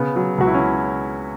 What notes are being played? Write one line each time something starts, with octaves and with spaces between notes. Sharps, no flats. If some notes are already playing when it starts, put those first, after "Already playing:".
Already playing: C#3 B3
F#3
C#2 F#4
E4
C#4